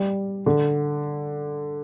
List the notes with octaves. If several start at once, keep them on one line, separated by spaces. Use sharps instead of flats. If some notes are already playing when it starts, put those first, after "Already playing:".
Already playing: G3
D3